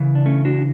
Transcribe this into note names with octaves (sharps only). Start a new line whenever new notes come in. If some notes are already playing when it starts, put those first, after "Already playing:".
Already playing: C#3 E3
D4
A3 C#4
D4 F#4